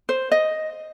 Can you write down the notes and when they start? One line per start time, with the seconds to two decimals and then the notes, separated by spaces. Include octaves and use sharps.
0.09 C5
0.32 D#5